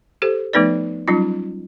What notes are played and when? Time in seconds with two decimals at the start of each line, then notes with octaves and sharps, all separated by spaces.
0.22 G4 A4 C5
0.53 F3 A3 B3 D#4 B4 D5
1.08 F#3 G3 C#4 D#4 F4